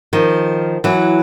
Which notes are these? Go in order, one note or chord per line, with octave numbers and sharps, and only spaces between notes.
D#3 F3
E3 F#3